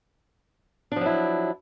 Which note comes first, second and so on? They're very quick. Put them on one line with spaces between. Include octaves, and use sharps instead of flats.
D4 F3 F#3 E4